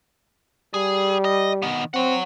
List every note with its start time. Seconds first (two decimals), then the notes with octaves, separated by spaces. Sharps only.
0.74 G3 G#4
1.25 D#5
1.62 D#3 B3
1.94 C4 C#5 F#5